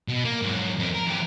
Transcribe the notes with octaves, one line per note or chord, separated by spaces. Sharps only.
B2
A#3
G#2 F#3
F2 A#4
A#4
E3 G4